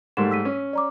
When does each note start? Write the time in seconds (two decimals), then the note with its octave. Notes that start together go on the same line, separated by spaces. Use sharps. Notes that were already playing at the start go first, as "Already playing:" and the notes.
0.17 G#2 G3 A3 A#4 C6 E7
0.31 E6 B6 D#7
0.45 C#4
0.73 D5 A#5 D6